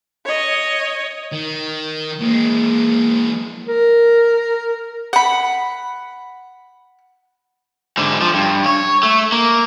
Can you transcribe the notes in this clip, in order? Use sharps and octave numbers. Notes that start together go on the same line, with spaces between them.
C#5 D#5
D#3
E3 G#3 A#3
A#4
F#5 B5
G#2 D3
F3
G2
C#5
A3
A#3